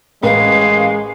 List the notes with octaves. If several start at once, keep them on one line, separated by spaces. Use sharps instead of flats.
A1 G#3 A#4 B4 F5